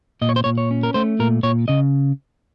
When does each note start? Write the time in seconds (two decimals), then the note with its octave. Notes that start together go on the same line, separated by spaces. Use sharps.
0.21 A#2 D#5
0.29 C#5
0.36 C5
0.44 A#2 C#5
0.58 C#5
0.71 C#4
0.83 A#4
0.94 A3 C5
1.19 A#2 A#4
1.43 A#2 C#5
1.68 C#3 D#5